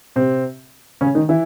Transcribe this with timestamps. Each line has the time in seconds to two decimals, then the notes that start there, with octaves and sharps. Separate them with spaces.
0.16 C3 C4
1.01 C#3 C#4
1.15 D#3 D#4
1.29 E3 E4